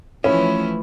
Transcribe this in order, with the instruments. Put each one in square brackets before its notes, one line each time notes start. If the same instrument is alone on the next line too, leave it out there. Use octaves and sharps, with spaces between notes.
[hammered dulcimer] A2 B4 B5 [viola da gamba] E3 F3 E4 [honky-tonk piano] C#4